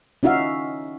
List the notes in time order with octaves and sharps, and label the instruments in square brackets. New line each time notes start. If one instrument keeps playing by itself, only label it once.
[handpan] C#4 D#4 F#4 E5 F5